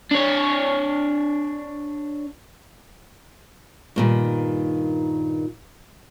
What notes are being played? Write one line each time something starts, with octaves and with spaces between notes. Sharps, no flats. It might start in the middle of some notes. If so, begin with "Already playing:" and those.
D4 C#5
G2 A#2 D#3